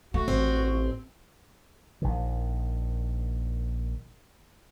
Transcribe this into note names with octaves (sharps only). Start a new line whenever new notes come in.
A3 F#4
A1 A2 C4
A#1 D#3